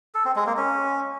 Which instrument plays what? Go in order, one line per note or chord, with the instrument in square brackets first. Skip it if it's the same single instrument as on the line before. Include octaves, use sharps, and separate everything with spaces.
[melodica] A4
C4
G#3
A#3
C#4